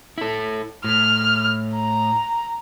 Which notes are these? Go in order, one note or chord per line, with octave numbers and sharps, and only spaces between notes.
E4 A4
A2 F6
A#5